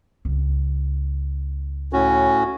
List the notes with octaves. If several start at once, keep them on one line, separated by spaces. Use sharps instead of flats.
C#2
A2 C#4 F#4